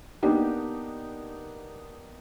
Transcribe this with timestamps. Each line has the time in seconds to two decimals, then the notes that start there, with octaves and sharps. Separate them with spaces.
0.22 A#3 B3 D4 D#4 G4